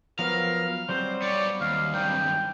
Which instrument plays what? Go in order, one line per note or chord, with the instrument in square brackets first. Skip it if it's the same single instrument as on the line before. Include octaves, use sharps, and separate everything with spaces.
[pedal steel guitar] F3 F#3 B3 [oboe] A#4 [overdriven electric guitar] F5
[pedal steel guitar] F#3 G3 C4 [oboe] C5
[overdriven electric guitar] B3 C#5 [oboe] D5
[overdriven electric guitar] D#2 [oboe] F5
[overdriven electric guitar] G2 D#3 [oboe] G5